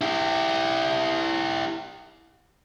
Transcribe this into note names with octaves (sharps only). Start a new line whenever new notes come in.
E4 G4